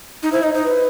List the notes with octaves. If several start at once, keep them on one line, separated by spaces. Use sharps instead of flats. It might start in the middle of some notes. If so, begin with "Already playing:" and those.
D#4
E4 C5
D#4 D#5
D#4 C5
B4